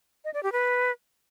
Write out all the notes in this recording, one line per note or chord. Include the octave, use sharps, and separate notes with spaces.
D#5
D5
G4
B4